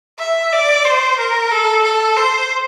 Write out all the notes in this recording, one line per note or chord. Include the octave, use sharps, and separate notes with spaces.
E5
D5
C5
A#4
A4
A4
C5